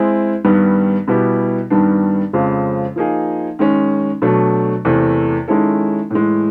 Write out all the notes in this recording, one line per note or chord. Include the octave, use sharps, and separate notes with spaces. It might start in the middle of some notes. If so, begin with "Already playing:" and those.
Already playing: G#3 C4 E4 G#4
G2 D#3 G3 B3
B2 G3 B3 E4 G4
G2 D#3 G3 B3 D4
F2 C#3 F3 G#3 C4
F3 A#3 D#4 G#4
D#3 G#3 C#4
B2 F#3 A3 D4
E2 C3 E3 A3
D#3 G#3 C#4 E4 A4
A2 E3 G#3